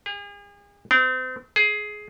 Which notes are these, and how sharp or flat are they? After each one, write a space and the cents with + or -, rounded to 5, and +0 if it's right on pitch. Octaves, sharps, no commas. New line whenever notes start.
G#4 -40
C4 -35
G#4 +15